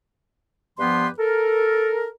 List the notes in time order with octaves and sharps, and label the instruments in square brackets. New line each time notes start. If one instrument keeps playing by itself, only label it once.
[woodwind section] G2 F3 B3 G4 B4 C6
A4 A#4